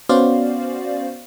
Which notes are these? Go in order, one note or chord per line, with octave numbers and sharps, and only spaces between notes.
B3 C#4 F#4 C5 D5 F5